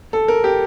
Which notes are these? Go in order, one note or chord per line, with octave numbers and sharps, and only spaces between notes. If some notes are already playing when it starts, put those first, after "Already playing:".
A4
A#4
G4